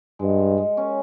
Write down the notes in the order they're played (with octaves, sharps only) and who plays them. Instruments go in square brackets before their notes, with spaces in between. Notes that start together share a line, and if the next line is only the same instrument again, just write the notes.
[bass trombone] G2 [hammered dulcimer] G#3
[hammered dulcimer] G#3
G#3
C#4